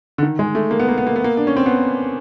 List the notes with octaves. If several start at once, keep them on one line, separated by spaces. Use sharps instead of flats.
D3
D#3
G#3
A3
A#3
B3
A#3
B3
A#3
B3
A#3
D4
C#4
C4
B3